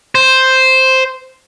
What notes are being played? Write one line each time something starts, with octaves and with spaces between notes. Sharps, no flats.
C5